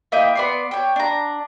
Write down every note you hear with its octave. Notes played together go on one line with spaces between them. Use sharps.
A#3 E4 D#5 G5
B3 D5 C6
C#5 G5
D4 A#5